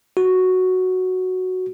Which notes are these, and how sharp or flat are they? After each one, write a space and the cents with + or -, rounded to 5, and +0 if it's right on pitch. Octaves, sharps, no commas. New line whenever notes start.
F#4 +0